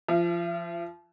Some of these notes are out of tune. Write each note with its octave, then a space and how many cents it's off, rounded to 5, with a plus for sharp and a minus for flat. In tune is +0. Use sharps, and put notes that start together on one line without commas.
F3 -20 E5 +40